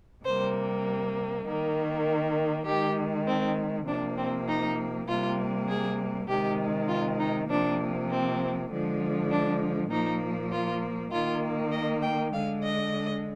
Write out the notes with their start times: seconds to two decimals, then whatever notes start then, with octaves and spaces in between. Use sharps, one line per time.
0.24 C3 G3 A#3 C5
1.45 D#3 A#3
2.66 D#3 G#3 G4
3.26 C4
3.87 C3 F3 A#3 D4
4.17 C4
4.47 D#4
5.07 C3 G3 A#3 F4
5.68 G#4
6.28 C3 D#3 G#3 G4
6.88 F4
7.19 D#4
7.49 C3 F3 A#3 D4
8.09 C4
8.69 D3 F3 G#3
9.30 D4
9.90 A#2 F3 A#3 D#4
10.51 F4
11.11 D#3 A#3 F4
11.72 D#5
12.02 G5
12.32 D3 G#3 F5
12.63 D#5